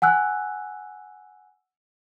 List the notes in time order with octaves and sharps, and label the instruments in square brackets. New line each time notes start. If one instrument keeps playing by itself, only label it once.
[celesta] F#5 G#5 E6 F#6